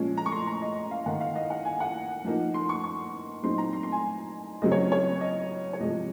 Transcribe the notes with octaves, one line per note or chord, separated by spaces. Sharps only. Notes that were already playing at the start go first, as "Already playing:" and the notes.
Already playing: A#2 F3 G#3 C#4
A#5
C#6
C6
A#5
D#5
F5
D#3 A#3 D#4 F#5
F5
D#5
F#5
G#5
F#5
F3 A#3 D#4
C6
C#6
C#6
A#2 F#3 C4 D#4 C6
A#5
C6
C6
G#5
C#3 F#3 C4 D#5
C#5
C#5
D#5
C#5
C3 F3 G#3 D#5